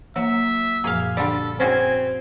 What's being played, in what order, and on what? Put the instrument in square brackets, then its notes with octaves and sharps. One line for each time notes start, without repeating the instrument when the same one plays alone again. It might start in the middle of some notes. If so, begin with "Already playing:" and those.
[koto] F#3 [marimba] A#3 [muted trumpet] E5
[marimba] F#2 A#2 F3 [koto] G#4 F5
[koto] D3 G3 [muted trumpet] A4
[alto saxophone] C4 [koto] C#4 F#4 G#4 [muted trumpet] G#5